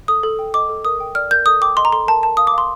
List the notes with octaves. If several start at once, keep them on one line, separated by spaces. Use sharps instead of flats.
A4 D#6
A4
G5
D#5 D6
A4
A#4 D#6
G5
D5 F6
A#4 G6
A4 D#6
G5 D6
D#5 C6
A#5
A4 C6
A#4 A5
A#4 A5
F5 D#6
D6
F5 C6